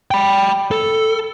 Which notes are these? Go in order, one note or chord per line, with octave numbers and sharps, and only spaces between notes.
G5 B5
A4